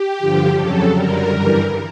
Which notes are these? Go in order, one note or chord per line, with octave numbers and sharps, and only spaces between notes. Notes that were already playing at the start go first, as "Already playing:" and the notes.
Already playing: G4
G2 D3 F3
F2 C#3 F#3 A4
F#2 D3 G3 A#4
G2 E3 G3